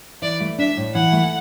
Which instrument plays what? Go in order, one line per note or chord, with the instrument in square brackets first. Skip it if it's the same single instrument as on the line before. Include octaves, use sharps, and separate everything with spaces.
[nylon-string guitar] E3 [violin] D5
[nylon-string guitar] A3
[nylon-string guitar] D4 [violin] E5
[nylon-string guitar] A2
[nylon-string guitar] E3 [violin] F#5
[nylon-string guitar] A3